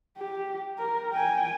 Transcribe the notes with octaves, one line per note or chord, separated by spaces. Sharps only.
G4
A#4
G5 G#5